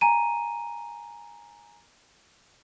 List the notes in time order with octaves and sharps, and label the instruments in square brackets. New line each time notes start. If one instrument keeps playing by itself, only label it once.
[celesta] G#5 A#5 D#7